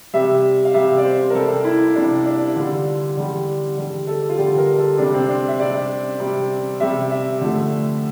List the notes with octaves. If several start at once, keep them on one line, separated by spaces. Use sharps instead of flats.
C3 G3 E5
F5
C3 G3 E5
D5
C5
A#4
C3 G3 A4
E4
C3 G3 D4
D4
D3 G3 F4
D3 G3
D3 G3
A4
F4
D3 G3 G4
A#4
A4
C3 G3 D4
C4
D4
E5
C3 G3 D5
C3 G3
C3 G3 E5
E5
D3 F3 A3